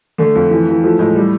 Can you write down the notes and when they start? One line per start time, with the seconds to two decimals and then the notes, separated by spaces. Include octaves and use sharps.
0.18 D3 A3
0.35 F2
0.51 E3
0.68 E3
0.83 F3 A3
0.99 A2 G#3
1.16 G3